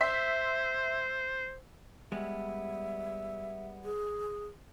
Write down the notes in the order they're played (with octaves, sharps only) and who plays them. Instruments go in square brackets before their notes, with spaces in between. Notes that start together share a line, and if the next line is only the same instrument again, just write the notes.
[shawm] C5 [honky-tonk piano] E5 C6 B6
[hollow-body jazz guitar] G3 G#3 B3 [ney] E5
[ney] G#4